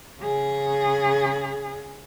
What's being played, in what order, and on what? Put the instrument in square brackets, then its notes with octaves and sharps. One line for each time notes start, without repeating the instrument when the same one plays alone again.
[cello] C#3 G#4